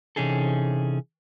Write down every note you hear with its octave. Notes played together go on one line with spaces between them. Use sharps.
C3 E3 C#4 D#4 G#4 A4